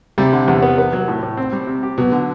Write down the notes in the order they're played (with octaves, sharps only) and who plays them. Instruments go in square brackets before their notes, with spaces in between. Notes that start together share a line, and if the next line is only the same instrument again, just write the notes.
[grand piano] C3 [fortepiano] G3
[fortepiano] D3
E2
B3
B3
F#3
A2
A2
C4
G3
C3
G4
[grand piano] B2 [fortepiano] F#3
[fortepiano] D3